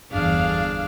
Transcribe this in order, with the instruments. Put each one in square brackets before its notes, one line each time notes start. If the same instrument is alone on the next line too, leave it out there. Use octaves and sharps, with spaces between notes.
[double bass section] G1 E2 [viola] D4 G#4 [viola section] F5